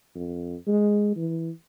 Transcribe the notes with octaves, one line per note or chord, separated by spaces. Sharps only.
F2
G#3
E3